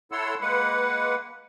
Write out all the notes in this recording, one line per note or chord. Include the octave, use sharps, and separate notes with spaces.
E4 A4 C#5 F#5 C6 E6
G#3 A#3 B4 F#5